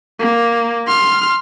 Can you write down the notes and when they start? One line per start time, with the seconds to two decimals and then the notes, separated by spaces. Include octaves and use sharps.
0.19 A#3
0.87 C6 F6